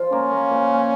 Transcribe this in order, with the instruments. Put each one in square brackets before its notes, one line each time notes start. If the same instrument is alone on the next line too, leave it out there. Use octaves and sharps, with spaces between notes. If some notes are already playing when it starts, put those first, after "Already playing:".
Already playing: [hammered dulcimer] F3 F4
[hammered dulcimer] A#3 [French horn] C#4
[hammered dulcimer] A#3
A#2
A#2